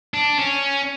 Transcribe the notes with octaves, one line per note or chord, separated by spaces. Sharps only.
D4
C#4